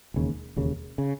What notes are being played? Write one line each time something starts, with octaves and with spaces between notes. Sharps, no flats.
E1 D#2 C#3
E1 D#2 C#3
C#3